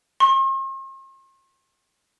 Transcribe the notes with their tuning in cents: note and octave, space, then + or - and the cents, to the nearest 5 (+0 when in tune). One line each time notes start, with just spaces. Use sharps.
C6 +45